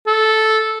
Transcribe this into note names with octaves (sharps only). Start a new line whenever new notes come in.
A4